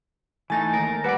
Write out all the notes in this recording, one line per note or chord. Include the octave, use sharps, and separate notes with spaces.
E3 A3 D#4 G#5 A6
D#2 A#4
G3 B4 D5 F#5